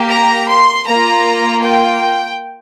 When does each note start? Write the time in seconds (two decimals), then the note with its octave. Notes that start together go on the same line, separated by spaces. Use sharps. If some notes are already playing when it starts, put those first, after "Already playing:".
Already playing: A#3 G4
0.11 A#5
0.49 C6
0.87 A#3 F4 A#5
1.64 G5